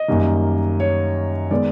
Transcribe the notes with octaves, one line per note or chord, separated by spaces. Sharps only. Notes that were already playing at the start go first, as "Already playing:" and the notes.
Already playing: D#5
F#2 D#3 G3 A#3
C#5
D#3 G#3 B3 D#4 D5